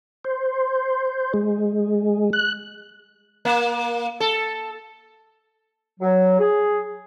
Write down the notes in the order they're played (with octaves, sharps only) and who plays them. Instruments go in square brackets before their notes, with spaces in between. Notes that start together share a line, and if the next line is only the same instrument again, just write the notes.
[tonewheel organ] C5
G#3
F#6
[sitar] A#3
A4
[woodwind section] F#3
G#4